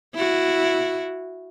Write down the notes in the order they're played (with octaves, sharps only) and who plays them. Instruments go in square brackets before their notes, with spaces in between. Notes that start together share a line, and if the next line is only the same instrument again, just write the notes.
[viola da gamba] E4 F#4